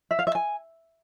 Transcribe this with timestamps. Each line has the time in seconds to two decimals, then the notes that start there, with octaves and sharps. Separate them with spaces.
0.11 E5
0.19 F5
0.27 E5
0.35 G#5